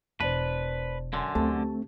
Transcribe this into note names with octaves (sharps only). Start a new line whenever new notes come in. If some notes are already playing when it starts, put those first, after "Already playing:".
E1 B4 C5 D5 A5
F#2 D3 G#5 C6
D2 A3 C4 G4 A5